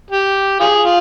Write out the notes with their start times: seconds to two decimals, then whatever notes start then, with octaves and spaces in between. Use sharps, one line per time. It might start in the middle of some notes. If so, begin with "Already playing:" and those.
0.11 G4
0.60 F4 G#4
0.85 F4